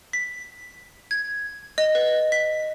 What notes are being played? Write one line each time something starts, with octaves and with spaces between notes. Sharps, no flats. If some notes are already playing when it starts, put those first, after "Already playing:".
B6
G#6
D#5
B4
B6